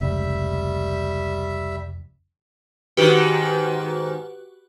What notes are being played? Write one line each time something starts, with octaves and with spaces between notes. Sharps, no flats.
F1 C#2 G3 E5
G#2 D#3 F#4 G4 B4